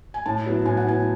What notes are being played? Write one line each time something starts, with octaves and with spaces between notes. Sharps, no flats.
G#5
A2 A5
F#3 B3 E4
A2 G#5
F#5
F#3 B3 E4 G#5